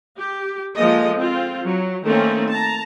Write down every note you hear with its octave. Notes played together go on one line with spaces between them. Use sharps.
G4
F3 G#3 A#3 A4 D#5
C4 F4
F#3
D#3 A3 A#3 C4 C#4
A5 A#5